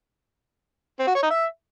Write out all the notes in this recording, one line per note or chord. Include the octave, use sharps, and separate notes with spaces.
C4
F#4
C#5
D#4
E5